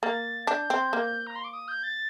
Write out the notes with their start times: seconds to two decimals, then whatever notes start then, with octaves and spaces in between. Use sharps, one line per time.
0.03 A#3 A6
0.47 D4 G6
0.70 C4
0.93 A#3
1.27 A#5
1.35 C6
1.44 D6
1.53 D#6
1.68 G6
1.83 A6